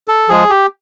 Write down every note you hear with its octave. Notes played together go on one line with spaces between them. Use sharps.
A4
F3 G#3 G#4
G4